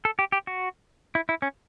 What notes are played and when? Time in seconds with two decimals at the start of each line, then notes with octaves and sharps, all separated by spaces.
0.05 A4
0.19 G4
0.32 G4
0.47 F#4
1.15 E4
1.29 E4
1.42 C#4